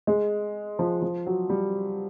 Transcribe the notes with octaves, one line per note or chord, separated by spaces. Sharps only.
G#3
F3
F3
F#3
G3